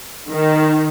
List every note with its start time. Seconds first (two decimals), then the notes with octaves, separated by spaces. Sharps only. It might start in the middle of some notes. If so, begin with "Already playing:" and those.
0.31 D#3